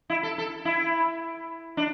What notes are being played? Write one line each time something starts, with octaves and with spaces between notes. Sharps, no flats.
E4
A4
A4
E4
D4